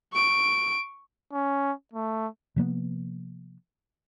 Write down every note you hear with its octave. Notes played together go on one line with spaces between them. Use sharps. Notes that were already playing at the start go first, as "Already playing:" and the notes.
C#6 D7
C#4
A3
C3 F3 A#3 B3